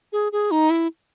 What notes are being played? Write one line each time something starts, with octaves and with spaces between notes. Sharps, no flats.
G#4
G#4
D#4
E4